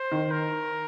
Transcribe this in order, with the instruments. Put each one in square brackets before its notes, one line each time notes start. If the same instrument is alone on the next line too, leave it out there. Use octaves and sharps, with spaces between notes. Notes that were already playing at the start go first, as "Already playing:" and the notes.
Already playing: [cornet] C5
[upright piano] D#3
[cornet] A#4